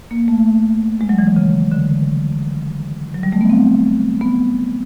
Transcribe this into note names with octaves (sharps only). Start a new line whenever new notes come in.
A#3
A3
G#3
F#3
E3
D#3
C#3
D3
F#3
G3
A3
B3
C4
B3